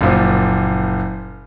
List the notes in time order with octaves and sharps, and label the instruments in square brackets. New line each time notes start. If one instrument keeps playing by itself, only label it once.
[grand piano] F#1 A#2 F3